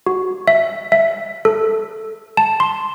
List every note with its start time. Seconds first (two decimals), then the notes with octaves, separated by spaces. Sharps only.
0.06 F#4
0.48 E5
0.92 E5
1.45 A4
2.37 A5
2.60 C6